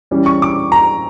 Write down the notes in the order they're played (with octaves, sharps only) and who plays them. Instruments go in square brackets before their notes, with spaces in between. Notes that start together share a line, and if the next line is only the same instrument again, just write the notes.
[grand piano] E3 G3 C#4
C#6
D6
A#5